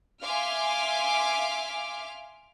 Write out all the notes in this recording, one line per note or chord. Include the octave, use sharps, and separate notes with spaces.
E5 F5 G#5 C6 D6 F6